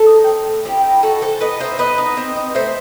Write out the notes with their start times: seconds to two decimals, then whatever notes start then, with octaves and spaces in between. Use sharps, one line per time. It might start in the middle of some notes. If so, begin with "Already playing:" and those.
Already playing: A4
0.08 D#4
0.27 C4
0.47 A2
0.65 C4 E4 G4
0.84 D#4
1.03 D#4 F#4 A4
1.21 E3 A4 C5
1.41 B3 B4 D#5
1.60 D#4 C5 E5
1.78 B3 B4 D#5
1.98 D#4
2.17 C4
2.36 D#4
2.55 A3 C5 E5